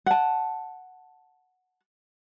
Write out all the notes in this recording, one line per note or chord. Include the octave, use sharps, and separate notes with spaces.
F#5 A5